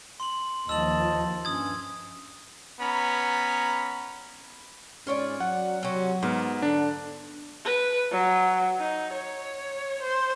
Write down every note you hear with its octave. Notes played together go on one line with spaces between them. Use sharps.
C6 F#7
D#2 F3 D#5 A5 E6 F#7
G2 C#4 D#6 G#6
B3 C#4 A#5 B5
G#2 C#4 F4 C#5 D5
F#3 F#5
C3 C#4
G#2 B3 A#4
D3 D4
B4
F#3
D#4
C#5
C5